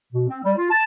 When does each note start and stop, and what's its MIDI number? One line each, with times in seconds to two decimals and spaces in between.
0.13 0.25 47
0.27 0.38 60
0.43 0.51 55
0.56 0.70 65
0.70 0.82 81